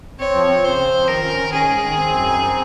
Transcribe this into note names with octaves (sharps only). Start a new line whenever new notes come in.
C4 C#5
F3
C4
C#3 C5
C4
F3
D#3 A#4
C#4
D#3
C#4 G#4
G#2
D#3
C4
F#2
D#4
C4